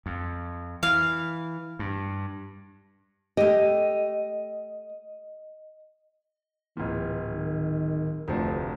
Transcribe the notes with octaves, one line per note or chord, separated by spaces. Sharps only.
F2
E3 F5
G2
A3 G4 D#5
D1 A#2 E3
D#3
F1 D2 F3